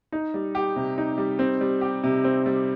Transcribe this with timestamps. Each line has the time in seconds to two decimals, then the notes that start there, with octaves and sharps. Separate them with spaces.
0.12 D#4
0.34 G3
0.55 G4
0.76 C3
0.98 D#4
1.18 G3
1.39 C4
1.61 G3
1.81 G4
2.04 C3
2.24 C4
2.46 G3